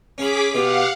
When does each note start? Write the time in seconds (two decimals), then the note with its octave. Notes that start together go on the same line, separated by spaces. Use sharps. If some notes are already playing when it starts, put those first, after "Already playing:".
0.18 C#4 G#4 F5 B5 D6 B6
0.54 B2 F4 G4 F5 F#5